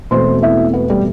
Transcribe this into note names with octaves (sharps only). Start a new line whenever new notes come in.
E1 E2 B2 A3 C4 C5 C6
E4 E5
B3 B4
G3 G4